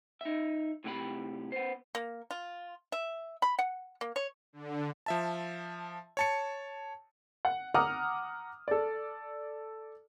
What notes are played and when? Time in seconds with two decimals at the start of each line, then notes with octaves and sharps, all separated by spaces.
0.21 D#4 E5
0.84 A2 C3 F#3 G4 D5 B5
1.52 B3 C5
1.95 A#3
2.31 F4
2.92 E5
3.42 B5
3.59 F#5
4.01 A#3
4.16 C#5
4.53 D3
5.06 F3 E5 A5
6.17 C#5 A5 C#7
7.45 F#5
7.74 F#5 A#5 D6 D#6 F6
8.68 A4 D5